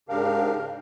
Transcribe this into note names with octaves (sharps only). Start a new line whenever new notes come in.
G#2 C#3 D4 G4 A#4 F5